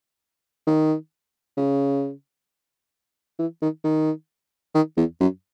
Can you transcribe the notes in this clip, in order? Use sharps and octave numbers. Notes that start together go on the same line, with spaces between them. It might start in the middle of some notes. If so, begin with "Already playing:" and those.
D#3
C#3
E3
D#3
D#3
D#3
E2
F#2